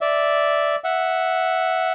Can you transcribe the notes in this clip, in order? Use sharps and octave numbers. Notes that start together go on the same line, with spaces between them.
D5 E5
E5 F#5